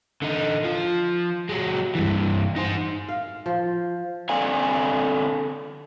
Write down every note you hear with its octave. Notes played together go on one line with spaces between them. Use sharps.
D3 D#4
F3
F#3 G#3
G2 E3
D#4 C5
F5
F3
D3 C4 A4 D5 F5 G#5